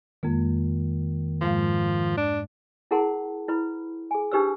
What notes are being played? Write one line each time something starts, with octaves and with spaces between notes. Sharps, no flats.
F2 D#3 G#3 A#3
G#2 F3 G#3 F5
D4
E4 G#4 A#4 F#5 A5 C6
E4 B4 B5
G#4 G#5
D4 D#4 G4 B4 C5 E6